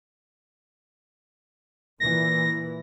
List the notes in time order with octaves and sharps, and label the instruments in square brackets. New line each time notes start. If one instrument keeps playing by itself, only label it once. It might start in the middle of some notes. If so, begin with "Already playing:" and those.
[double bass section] A#2 E3 [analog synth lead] A#6